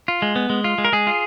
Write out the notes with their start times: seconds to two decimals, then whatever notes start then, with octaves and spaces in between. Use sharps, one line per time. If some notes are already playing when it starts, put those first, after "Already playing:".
0.08 F4
0.22 G#3
0.36 B3
0.50 G#3
0.64 F4
0.78 G#3
0.85 A#4
0.92 G#3 G#4
1.07 F4